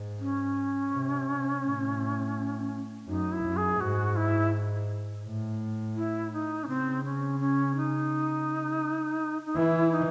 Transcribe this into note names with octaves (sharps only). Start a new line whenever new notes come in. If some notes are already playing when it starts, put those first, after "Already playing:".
Already playing: G#2
C#4
C3
A2
F#2 D#4
E4
F#2
G#4
G#2 F#4
E4
A2
E4
D#4
C#4
C#3 C4
C#4
C#4
D#4
D#4
E3 E4
D#4